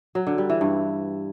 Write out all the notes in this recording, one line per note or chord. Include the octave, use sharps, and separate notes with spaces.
F#3
D3
G3
E3
G2